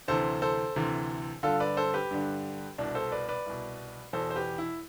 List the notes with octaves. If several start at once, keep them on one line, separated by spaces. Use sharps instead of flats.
D2 C3 E3 A4 C5
A4 C5
D2 C3 E3
G2 D3 F4 A4
B4 D5
A4 C5
G4 B4
G2 D3
C2 B2 D4
A4 C5
B4 D5
B4 D5
C2 B2
E2 B2 A4 C5
C5
G4 B4
E4